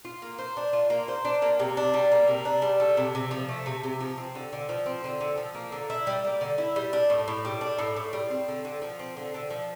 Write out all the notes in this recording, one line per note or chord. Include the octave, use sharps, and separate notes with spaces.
F4
A#3
C5
D4
F4
A#3
C5
D4
A#3
C3
D4
G3
A#3
C3
D4
G3
A3
C3
C3
F3
A3
C3
C3
F3
C4
D3
D3
F3
C4
D3
D3
F3
A#3
D3
E4
G3
A#3
D3
E4
G3
D4
A2
A2
G3
D4
A2
A2
G3
C4
D3
D3
F3
C4
D3
D3
F3